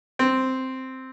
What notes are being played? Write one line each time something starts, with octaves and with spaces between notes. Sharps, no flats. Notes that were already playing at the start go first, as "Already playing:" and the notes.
C4